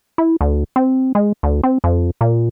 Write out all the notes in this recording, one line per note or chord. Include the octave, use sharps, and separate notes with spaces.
E4
D2
C4
G#3
D2
C4
F2
A#2